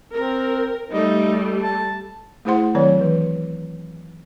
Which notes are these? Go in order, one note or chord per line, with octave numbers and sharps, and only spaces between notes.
C4 A#4
G3 A3 D#4
A5
A3 E4 G#4 C5 F#5 C6
D#3 F#3 C4 C#5 D5
E3